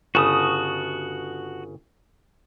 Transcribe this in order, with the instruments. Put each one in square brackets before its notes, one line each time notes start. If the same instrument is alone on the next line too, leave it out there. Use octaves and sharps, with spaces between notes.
[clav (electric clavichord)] G1 C#3 [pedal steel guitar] F#4 A5 D#6